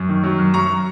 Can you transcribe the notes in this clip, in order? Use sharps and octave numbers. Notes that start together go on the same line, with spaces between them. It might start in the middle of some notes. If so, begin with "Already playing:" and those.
Already playing: F#2
D#3
F#3
F#2
F#3 A#5 C#6